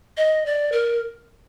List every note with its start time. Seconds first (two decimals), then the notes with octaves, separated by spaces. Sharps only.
0.17 D#5
0.46 D5
0.72 A#4